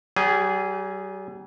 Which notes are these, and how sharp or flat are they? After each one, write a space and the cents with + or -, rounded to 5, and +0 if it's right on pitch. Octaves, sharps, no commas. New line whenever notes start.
G3 -45 G#4 -5